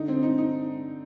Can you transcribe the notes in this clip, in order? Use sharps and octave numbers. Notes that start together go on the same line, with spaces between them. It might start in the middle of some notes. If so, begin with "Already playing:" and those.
Already playing: D3 D#4
C4
D#4
D#4